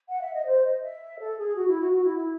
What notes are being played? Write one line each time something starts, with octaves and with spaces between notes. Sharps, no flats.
F#5
E5
D#5
C5
D#5
E5
A4
G#4
F#4
E4
F#4
F#4
E4
E4